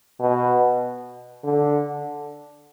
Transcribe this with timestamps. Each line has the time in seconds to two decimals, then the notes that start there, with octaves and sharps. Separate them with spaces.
0.20 B2
1.44 D3